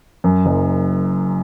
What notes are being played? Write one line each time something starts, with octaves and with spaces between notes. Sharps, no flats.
F#2
F#1